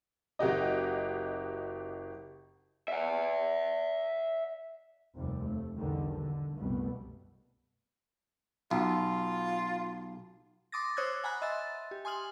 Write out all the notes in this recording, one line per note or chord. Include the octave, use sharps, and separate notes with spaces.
F#1 F#4 G4 D#5
E5 F#5
F1 D#2 C3 F3 G3
A3
B1 E2 D3 D#3 G3
D3
C2 F#2 B2 G3 A3 B3
B1 F4
C6 D6 D#6 A6 A#6
C5 C#5 D#6 E6 F#6 G#6
F#5 G#5 A#5 B5 F#6
D#5 E5 C6 E6 A6
G4
G#5 C6 D#6 F6 F#7